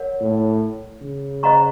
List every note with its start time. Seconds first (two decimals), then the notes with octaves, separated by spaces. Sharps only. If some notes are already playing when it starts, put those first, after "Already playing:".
Already playing: A#4 C#5 F#5
0.21 A2
1.02 C#3
1.43 C5 D#5 F#5 A#5 C#6